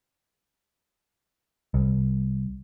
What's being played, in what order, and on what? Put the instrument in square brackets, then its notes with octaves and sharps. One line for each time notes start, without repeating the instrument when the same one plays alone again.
[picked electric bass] C2